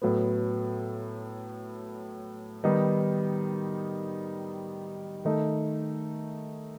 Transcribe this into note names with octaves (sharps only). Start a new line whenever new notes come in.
A2 F#3 B3
D#3 G3 B3 D#4
D#3 A3 D#4